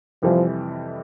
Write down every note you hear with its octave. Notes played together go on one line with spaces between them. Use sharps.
F2 C3 E3 F3 G3